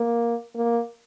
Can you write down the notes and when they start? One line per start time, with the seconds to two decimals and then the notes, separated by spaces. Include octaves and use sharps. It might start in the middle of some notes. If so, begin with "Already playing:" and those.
Already playing: A#3
0.56 A#3